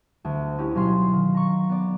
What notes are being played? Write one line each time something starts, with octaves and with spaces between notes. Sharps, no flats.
D2
C#4 D#4 E4 G4
B2 F#3 C#4 F5 C6
D#3
A#5 C#6
B3 D5